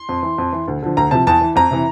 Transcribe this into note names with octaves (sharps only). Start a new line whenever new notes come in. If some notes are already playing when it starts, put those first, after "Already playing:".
Already playing: C6
F2
E3
F2
E3
D2
D3 F3
D2 A#5
C3 F3 A5
E2 A5
E3
F2 A#5
C3 E3